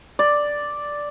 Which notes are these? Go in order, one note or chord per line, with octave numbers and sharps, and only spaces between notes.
D5